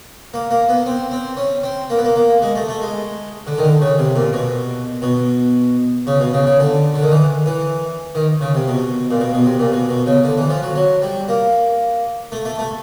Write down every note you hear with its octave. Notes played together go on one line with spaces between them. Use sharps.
A#3
A#3
B3
C4
C4
C#4
C4
A#3
B3
A#3
A#3
G#3
A3
A3
G#3
D3
D#3
D3
C#3
C3
A#2
B2
B2
C#3
B2
C#3
C#3
D3
D3
D#3
E3
E3
D#3
C#3
C3
B2
A#2
B2
B2
C3
A#2
B2
B2
C#3
D3
E3
F3
F#3
F#3
G3
A#3
A3
A3
A3